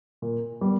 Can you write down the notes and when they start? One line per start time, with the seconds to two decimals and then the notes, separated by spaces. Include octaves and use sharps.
0.22 A#2
0.61 G3 B3